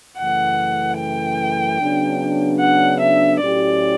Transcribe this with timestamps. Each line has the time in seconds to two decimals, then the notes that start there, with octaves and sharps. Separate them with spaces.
0.18 F#2 C#3 E3 A3 F#5
0.98 G5
1.80 C#3 F#3 B3 D4
2.60 F#5
3.00 E5
3.41 A2 F#3 C#4 E4 G4 D5